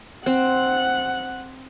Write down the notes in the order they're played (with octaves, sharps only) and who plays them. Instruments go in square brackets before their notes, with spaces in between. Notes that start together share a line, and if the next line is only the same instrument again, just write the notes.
[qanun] C4 [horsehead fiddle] F#5